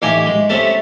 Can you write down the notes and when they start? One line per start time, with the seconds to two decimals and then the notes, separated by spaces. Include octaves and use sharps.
0.02 A1 D#4 E4 G4 F5 G#5
0.26 G#3
0.49 C3 A3 C#4 A4 E5 A5